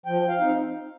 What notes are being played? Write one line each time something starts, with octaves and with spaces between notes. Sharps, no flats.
F3 G5
F5
C4 D#4